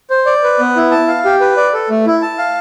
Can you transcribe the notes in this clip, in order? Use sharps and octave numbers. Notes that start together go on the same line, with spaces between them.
C5
D5
B4
B3
E4
A5
F5
G4
B4
D5
A4
A3
E4
A5
F5